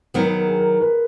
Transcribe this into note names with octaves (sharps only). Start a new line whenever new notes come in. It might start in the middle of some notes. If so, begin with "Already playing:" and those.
D#3 F#3 B3 A#4
B4
A#4
G#4
A#4
B4